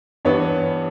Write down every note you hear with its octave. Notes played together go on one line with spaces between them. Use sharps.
G2 E3 B3 D4 C#5